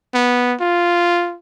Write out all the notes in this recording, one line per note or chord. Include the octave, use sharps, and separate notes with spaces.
B3
F4